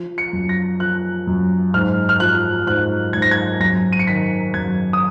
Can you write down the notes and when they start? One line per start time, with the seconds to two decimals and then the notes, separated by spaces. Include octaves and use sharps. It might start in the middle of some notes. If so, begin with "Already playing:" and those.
Already playing: F3
0.18 C#7
0.33 F#2
0.49 A#6
0.80 F3 F#6
1.27 F#2
1.74 G#2 F6
2.09 F6
2.20 F3 F#6
2.67 G#2 F#6
3.13 G#2 G#6
3.22 A#6
3.31 G#6
3.60 F#2 A#6
3.93 D#7
3.99 C#7
4.07 D#3 B6
4.54 F#2 G#6
4.93 D#6